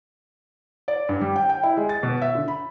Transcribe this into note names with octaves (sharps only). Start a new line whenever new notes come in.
D5
G2
G3
G5
G5
E4
G#3
A6
B2
E5
D3
B5